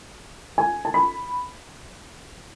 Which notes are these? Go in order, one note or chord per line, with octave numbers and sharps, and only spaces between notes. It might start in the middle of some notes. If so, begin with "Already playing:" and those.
G#5
A5
B5